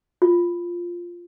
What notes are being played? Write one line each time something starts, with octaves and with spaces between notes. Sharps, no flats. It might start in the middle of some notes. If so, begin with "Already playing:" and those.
F4